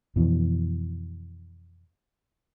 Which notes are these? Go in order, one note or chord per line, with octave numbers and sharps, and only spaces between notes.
F2 B2 E3